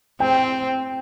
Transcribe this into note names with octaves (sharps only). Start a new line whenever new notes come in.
C4 G5